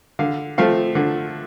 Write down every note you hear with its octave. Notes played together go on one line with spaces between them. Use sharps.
D3 F5
F3 A3 C4 F5
D3